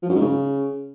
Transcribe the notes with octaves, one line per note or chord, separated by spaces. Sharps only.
F3
F#2
G#2
C#3